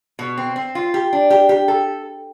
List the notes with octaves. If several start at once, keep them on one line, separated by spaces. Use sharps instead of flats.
B2
C4
C4
F4
G4
D4
G4
G4
A4